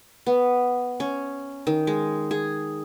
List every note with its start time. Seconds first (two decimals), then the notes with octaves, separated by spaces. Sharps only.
0.26 B3
1.00 C#4
1.67 D#3
1.87 G#3
2.31 G#4